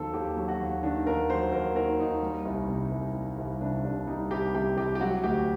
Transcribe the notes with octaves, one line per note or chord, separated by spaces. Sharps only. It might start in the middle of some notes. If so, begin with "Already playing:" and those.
Already playing: D#2 D#3 F#3 A4 C5
D#2 G4
F#3
F#4
D#2
D#3 D4
D#2 A#4
F#3 C5
D#2 A#4
D#3 A#4
D#2 D#4
G3
C2
C3
C2
G3
C2
C3 D4
C2 D4
G3 D#4
C2 G4
C3 G4
C2 G4
G4
F#3 F#4
D2 G4